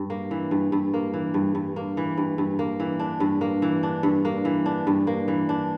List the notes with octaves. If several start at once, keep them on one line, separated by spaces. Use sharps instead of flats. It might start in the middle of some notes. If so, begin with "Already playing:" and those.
Already playing: G2
A#3
E3
G2
G2
A#3
E3
G2
G2
A#3
E3
G2
G2
A#3
E3
D4
G2
A#3
E3
D4
G2
A#3
E3
D4
G2
A#3
E3
D4